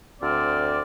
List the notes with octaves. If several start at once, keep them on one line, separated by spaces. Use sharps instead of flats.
D2 C4 D5 F6